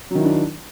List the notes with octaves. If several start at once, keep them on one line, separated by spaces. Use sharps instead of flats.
D#3 F#3 D4 E4